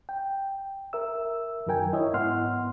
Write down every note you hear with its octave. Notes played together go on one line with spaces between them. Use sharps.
G5
A#4 E5 E6
F#2 D#3 F#3 A#4 G5 G#5
E4 C#5 D#5 E5
G#2 B3 F#5 C6 F6